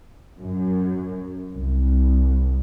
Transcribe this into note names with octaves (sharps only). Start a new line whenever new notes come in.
F#2
C2